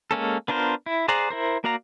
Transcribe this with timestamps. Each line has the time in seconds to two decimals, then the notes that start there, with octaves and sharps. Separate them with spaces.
0.11 G#3 A#3 C#4 A4
0.48 B3 D4 F4 A#4 C5
0.86 E4
1.08 G#4 C5 D5 F#5 A#5
1.30 E4 A#4 C5
1.64 A#3 F#4 D5 F5 A#5